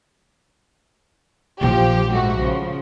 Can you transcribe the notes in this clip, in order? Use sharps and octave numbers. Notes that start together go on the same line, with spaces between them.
A#1 A#2 F3 G4
G#2 A3 F#4
C#3 F3